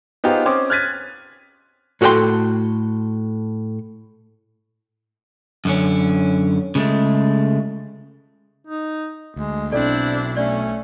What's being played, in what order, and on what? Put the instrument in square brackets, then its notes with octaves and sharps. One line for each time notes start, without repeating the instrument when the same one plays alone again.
[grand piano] B3 D#4 F4 G4 G#4 C5
C4 C#4 C5 D6 D#6
F6 F#6 G#6 A6 B6 D#7
[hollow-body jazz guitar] A2 F#4 A4 C#5 G5 C6
[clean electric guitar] F#2 D3 C#4
C#3 G#3 A3
[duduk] D#4
[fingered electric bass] D2 [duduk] G#3
[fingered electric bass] B1 B2 [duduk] C4 [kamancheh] D4 E4 [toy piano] A4 D5
[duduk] A3 [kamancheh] C#4 [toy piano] D5